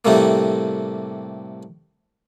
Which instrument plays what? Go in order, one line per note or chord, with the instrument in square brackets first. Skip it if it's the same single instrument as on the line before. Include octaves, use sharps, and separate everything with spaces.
[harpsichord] A2 C3 G3 A3 A#3